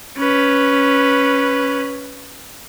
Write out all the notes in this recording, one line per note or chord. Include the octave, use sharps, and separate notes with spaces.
C#4 B4